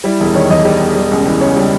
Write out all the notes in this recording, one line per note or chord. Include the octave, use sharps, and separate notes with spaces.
G3 E4
E1 E4
D#3 C#5
E2 D#5
G3
E1
G3
C#2
E3
C#3 C#5
G3